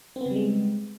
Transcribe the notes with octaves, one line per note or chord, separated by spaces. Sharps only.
C#3 G3 G#3 B3 C4